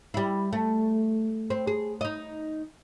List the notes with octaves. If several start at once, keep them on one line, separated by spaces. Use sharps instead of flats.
G3 E4
A3
C4
G#4
D#4 D#5